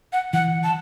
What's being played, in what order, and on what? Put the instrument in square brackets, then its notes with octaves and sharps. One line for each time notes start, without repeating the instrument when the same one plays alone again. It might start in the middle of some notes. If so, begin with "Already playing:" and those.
[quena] F#5
[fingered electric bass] E3 [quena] F#5
[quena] A5